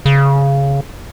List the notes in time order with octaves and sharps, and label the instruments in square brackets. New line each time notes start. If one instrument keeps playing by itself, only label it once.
[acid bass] C#3